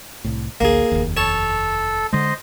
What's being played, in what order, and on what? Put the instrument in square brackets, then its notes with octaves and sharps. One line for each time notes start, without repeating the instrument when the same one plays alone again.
[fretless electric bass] C2 A2
[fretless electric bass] A1 D2 [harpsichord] A#3 G#4
[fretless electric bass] F1 D#2
[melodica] A4 [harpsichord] C#5 A5
[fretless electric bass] D3 G#3 [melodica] C5 D#5